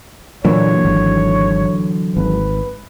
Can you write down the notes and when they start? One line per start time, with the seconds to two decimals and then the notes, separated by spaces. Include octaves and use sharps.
0.45 A#2 D3 E3 F#3 C#5
0.85 G#1
2.17 G#1 B4